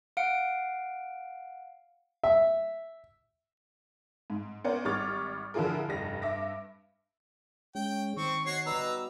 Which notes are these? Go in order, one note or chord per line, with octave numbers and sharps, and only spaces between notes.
F5 F#5 D7
E5
G#2
B3 C#4 A#4 C5 D5 F#5
G#1 G3 C#6 D6 F6 A6
D3 F3 E4 F4 G#4 A#4
F1 G2 G3 A#6
G2 E5 D6 A#6
G#3 C#4 G5
D#3 C4 C#6
B2 F#4 C#5 C7
G3 D#4 B4 A#5 E6